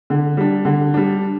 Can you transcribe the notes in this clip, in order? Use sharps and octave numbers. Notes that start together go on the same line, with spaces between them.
D3
G3 D4
D3
G3 D4